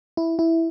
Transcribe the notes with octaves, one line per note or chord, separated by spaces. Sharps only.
E4
E4